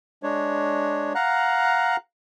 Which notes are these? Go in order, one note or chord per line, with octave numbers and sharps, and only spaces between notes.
G#3 D4 C#5
F5 F#5 A#5 F#6